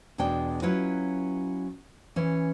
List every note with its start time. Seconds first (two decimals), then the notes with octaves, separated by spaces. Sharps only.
0.18 E2 B2 G#3 D4 G5
0.62 F#3 C#4 E4 F4 B4
2.16 E3 C#4